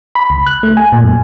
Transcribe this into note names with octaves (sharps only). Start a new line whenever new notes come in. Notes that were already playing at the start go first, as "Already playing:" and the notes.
B5
C#2
F#6
A3
G#5
A#2
F#2